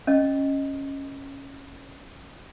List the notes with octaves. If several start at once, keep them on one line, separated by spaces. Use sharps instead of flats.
C#4 D#5